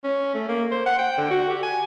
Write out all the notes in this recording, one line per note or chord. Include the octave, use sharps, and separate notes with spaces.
C#4
A3
A#3
C5
F#5
G5
D3
F#4
G4
G#5